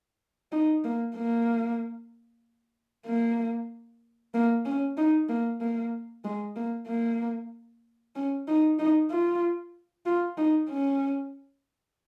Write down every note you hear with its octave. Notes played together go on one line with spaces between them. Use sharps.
D#4
A#3
A#3
A#3
A#3
C#4
D#4
A#3
A#3
G#3
A#3
A#3
C#4
D#4
D#4
F4
F4
D#4
C#4